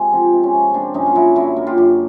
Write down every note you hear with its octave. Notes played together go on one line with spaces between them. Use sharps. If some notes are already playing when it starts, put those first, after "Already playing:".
Already playing: C3 G#3
F3 C4
C3
C#4
C3
A#3 C4 D4
F#2 C#4 D#4
F4
F#3 E4 F#4
D3 E4 F#4
A#3
F4 G4
F#2